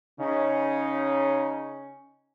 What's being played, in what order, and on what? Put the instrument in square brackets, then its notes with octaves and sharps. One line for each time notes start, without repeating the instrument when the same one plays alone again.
[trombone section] C#3 D#4 [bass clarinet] C#4